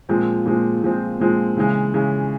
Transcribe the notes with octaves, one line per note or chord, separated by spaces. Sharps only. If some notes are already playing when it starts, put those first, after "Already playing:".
A#2 F3 G#3 C4
A#2 F3 G#3 C4
A#2 F3 G#3 C4
A#2 F3 G#3 C4
C#3 E3 G#3
C#3 E3 G#3